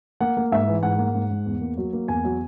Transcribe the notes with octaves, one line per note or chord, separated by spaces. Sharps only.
A#3 F#5
A#3
G#2 E5
E3
G#2 F#5
A#3
G#2
G#2
E2
A#3
F#3
A#3
E2 G#5
F#3